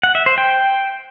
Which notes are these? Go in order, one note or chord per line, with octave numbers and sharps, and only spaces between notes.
F#5
E5
C5
G5